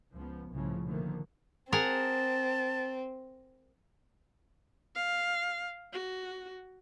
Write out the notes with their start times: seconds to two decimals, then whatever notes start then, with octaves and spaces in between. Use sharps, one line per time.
0.14 C#2 F3 B3
0.51 C2 A2 C#3 F3
0.85 B2 D3 D#3 F3 A3 A#3
1.72 C4 G#4 A#4 F#5 A5
4.95 F5
5.93 F#4